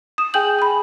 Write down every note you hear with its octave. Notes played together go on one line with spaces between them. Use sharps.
D#6 E7
G#4 G5 G#5 G6 F#7
G#5 B5